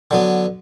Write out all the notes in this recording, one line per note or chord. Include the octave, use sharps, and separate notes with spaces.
D3 F#3 B3